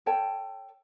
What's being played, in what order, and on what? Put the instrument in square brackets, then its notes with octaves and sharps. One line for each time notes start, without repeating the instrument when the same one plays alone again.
[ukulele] A4 C#5 G5 A5